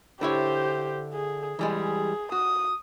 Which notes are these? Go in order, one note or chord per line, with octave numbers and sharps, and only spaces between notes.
D3 E4 G4 C5 C#5
G#4
E3 G3 G#3 G#4
F#4 D#6